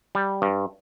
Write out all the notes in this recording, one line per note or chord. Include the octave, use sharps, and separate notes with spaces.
G3
G2